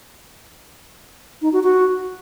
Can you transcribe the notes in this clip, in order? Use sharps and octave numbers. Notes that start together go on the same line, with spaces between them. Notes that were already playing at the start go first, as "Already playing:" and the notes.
D#4
F#4
F#4